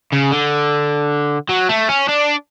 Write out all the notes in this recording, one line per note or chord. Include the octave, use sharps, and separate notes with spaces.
C#3
D3
F#3
A3
C#4
D4